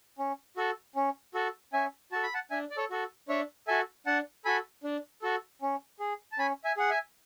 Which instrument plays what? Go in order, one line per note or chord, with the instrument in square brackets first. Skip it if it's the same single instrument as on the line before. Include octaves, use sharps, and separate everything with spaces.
[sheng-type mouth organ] C#4
F#4 A4
C#4
F#4 A4
C#4 E5 G#5
F#4 A4 A5
B5
F#5 A5
D4 E5 G#5
D5
A4 C#5
F#4 A4
D4 C#5 E5
F#4 A4 E5 G#5
D4 F#5 A5
F#4 A4 G#5 B5
D4
F#4 A4
C#4
G#4
A5
C#4 G#5 B5
E5 G#5
G#4 F#5
E5 G#5